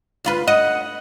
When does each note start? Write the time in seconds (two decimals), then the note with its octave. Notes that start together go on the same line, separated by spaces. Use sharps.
0.25 D2 F4 B4
0.48 D#5 F#5